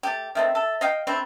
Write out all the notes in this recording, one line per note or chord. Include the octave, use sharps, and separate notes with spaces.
A3 G4
D#3 A3 C4 E5
A4
D#5 F5 G5
A3 C4 D4 B5